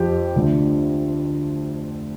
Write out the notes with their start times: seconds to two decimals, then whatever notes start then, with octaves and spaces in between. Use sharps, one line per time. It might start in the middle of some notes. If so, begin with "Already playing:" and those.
Already playing: F2 F3 G4
0.34 D2 D3 F3